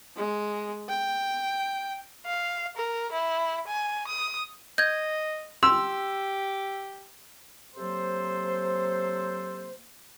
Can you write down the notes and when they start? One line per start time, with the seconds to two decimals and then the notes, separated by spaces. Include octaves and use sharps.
0.16 G#3
0.89 G5
2.26 F5
2.77 A#4
3.13 E4
3.68 G#5
4.08 D#6
4.78 D#5 G6 G#6
5.63 G4 C6 E6
7.76 C3 F#3 A#3 A4 C5